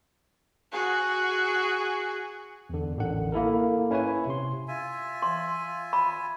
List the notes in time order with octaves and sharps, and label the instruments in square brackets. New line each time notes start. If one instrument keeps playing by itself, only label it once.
[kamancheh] F#4 G#4
[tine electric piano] E2 D3
A1 D3 D#3 F#5
A#3 E4 A4 A#4
C#4 E4 B4 C#5 G#5
C3 C6
[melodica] F4 E5 G#5
[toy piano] C6
B5